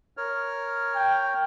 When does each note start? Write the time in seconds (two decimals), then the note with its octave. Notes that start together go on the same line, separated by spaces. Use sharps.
0.17 A#4 C#5 F6
0.95 G5